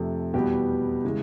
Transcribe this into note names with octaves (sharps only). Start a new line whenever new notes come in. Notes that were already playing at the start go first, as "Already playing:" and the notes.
Already playing: F2 C3 F3 A3
E2 B2 G3 B3 G4
C#3 E3 G#3